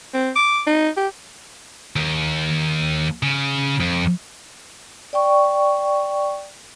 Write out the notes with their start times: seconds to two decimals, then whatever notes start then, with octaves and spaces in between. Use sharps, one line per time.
0.14 C4
0.36 D6
0.67 D#4
0.97 G4
1.96 D#2
3.23 C#3
3.80 F2
5.13 D5 G5 C#6